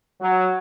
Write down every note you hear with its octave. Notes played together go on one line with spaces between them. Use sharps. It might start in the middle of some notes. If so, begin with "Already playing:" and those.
F#3